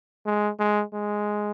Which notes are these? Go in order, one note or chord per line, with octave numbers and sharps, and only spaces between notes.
G#3
G#3
G#3